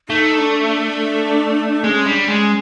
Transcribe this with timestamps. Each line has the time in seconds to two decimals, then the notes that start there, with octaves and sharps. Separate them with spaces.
0.09 A3 D#4
0.38 D4
0.67 D4
1.84 G#3 C#4
2.05 G3 D4
2.28 G#3 C#4